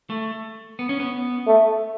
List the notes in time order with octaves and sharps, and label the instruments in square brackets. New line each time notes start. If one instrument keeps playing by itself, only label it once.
[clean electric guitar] A3
B3
C#4
B3
[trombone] A3